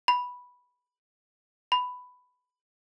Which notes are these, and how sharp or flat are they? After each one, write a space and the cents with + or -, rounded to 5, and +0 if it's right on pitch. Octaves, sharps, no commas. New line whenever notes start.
B5 -5
B5 +10